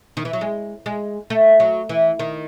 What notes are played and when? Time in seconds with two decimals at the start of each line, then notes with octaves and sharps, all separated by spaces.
0.17 D#3
0.25 E3
0.33 F#3
0.41 G#3
0.86 G#3
1.30 A3
1.60 F#3
1.89 E3
2.19 D#3